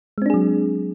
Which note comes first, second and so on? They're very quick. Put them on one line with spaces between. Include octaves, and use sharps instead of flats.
G#3 C4 D4 G#4 F#3